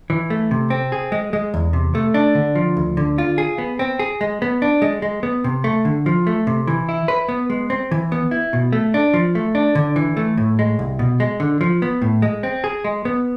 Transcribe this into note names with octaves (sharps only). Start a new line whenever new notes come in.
E3
A3
C3
C4
G#4
G#3
G#3
E2
C3
A3
D4
D3
F3
D2
D3
F4
G#4
B3
C4
G#4
G#3
B3
D4
G#3
G#3
B3
C3
A3
D3
F3
A3
C3
E3
E4
B4
B3
G#3
C4
E3
B3
E4
B2
A3
D4
F3
A3
D4
D3
E3
A3
A2
G#3
C2
B2
G#3
D3
F3
B3
A2
G#3
C4
G#4
G#3
B3